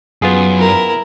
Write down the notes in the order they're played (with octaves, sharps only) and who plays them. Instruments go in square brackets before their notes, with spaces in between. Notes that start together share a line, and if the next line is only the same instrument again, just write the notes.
[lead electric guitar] F#2 [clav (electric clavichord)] B3 F4 G#4
[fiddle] E4 A#4